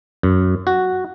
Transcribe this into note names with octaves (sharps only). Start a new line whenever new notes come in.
F#2
F#4